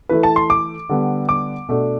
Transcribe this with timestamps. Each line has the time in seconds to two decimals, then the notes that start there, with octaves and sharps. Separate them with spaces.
0.09 E3 A3 E4 B4
0.23 A5
0.36 C6
0.50 D6
0.89 D3 G3 B3
1.29 D6
1.68 B2 A3 D4